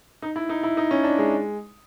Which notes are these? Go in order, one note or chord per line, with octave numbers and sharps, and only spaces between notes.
D#4
E4
D#4
E4
D#4
C#4
D4
G#3